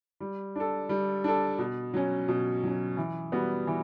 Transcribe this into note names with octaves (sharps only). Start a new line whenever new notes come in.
G3
D4 A4
G3
D4 A4
B2
F#3 C#4
B2
F#3 C#4
E3
G3 B3 F#4
E3